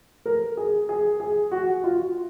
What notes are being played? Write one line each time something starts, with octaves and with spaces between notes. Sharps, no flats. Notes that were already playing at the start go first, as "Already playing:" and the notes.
A#4
G#4
G#4
G#4
F#4
F4